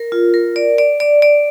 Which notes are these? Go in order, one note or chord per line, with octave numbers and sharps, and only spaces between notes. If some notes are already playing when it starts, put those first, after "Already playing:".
Already playing: A#4
F4
A#4
D5
D5
D5
D5